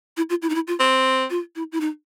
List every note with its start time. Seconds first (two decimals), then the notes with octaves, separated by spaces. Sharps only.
0.17 E4
0.30 F4
0.42 E4
0.50 D#4
0.55 E4
0.67 F4
0.80 C4
1.30 F4
1.56 E4
1.72 E4
1.81 D#4